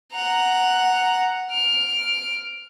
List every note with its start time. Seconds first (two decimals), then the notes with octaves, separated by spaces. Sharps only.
0.13 F#5 A#5
1.51 F6 D7